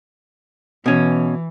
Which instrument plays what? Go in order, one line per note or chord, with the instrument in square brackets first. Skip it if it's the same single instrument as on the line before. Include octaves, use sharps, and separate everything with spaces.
[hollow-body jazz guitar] B2 C#4 [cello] E3